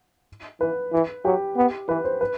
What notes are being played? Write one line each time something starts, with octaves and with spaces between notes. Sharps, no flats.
E3 B4
E3
F#3 G4
B3
E3 B4
C5
B4